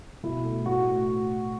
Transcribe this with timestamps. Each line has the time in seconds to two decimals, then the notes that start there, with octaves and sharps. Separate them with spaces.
0.23 B2 E4
0.44 A3
0.66 A2 F#4